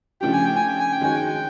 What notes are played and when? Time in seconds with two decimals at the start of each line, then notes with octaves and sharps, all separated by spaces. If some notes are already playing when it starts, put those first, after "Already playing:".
0.21 C#3 F3 A3 D4 G4 G5
0.33 G#5
0.45 G5
0.56 G#5
0.68 G5
0.80 G#5
0.92 G5
1.01 D#3 G#3 C#4 F#4 G#5
1.15 G5